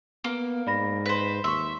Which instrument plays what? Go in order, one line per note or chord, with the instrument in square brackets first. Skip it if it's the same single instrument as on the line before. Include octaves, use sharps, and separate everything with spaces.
[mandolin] A#3 [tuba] B3
[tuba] G#2 [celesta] D5 B5 A#6
[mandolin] B4 C5
[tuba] D#2 [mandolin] E5 [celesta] C6 C#6